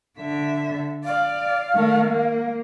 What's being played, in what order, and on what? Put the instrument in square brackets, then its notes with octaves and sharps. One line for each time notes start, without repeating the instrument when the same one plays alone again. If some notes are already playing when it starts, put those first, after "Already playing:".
[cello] D3 E5
[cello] D5 [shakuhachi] F5
[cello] D#3 A3
A#3